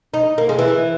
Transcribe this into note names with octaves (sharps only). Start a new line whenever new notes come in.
D#4
A#3
G#3
E3